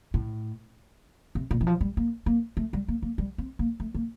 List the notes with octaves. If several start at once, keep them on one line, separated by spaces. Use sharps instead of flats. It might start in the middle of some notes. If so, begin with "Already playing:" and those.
A2
C3
A#2
E3
F3
G3
A#3
A#3
A3
G3
A#3
A#3
G3
C4
A#3
A3
A#3